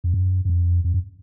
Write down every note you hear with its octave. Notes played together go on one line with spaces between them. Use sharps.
F2
F#2
F#2
F2
F2
F#2